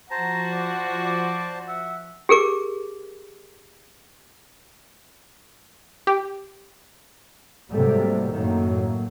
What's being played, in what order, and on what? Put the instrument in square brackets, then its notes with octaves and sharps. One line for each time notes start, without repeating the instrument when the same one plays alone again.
[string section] F3 F#4 [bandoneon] C5 A5 [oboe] A#5
[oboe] D5
D5
[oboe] E5 [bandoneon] F#5
[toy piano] G4 G#4 A#4 D6
[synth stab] G4
[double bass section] G#2 C3 F#3 G3 A3 A#3
F#2 A2 D#3 F#3 A#3